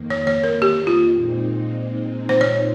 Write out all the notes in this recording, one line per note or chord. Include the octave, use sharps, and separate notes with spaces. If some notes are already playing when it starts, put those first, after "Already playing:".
Already playing: F2 D#3 A#3
C#5
C#5
A#4
G4
F4
A#2 G#3 C4 D#4
C5
C#5